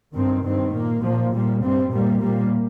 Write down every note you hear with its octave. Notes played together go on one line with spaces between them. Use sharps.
G2 D#3 C4
G2 D#3 C4
A#2 A#3
A#2 F3 A#3
A#2 G3 A#3
G2 G3 C4
A#2 G3 A#3
A#2 G3 A#3